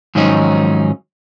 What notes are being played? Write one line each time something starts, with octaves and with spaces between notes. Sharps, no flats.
G#2 D#3 F3 F#3 C#4 D#4